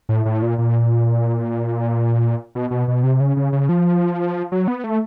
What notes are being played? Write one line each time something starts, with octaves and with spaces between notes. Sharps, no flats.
A2
A2
A#2
A#2
B2
B2
B2
C3
C#3
C#3
C#3
F3
F#3
B3
A3